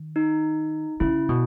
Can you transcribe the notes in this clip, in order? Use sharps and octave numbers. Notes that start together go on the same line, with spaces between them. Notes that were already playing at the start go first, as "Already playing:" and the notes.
Already playing: D#3
D#4
C#3 E4
B2